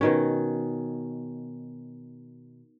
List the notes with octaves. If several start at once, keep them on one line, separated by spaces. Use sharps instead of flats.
B2 D#3 C#4